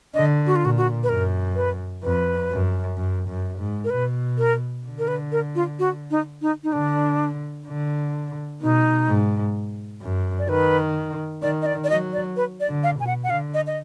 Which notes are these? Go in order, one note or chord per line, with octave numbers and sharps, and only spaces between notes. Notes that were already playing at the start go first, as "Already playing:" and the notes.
D3 D#5
F#4
F4
A#2 F#4
F#4
B4
F#2 A#4
B4
F2 B4
F#2
F#2
F#2
G#2
A#4
B2 B4
A#4
D3
A#4
B4
A#4
F4
F#4
D#4
D#4
D#4
D3 D4
D3
B2 D#4
G#2
F#2
D5
D#3 B4
D#3 D5
D#5
D5
D5
F#3 D#5
D5
B4
D5
D3
F5
B2 G#5
F#5
F#5
D3 F5
D#5
D#5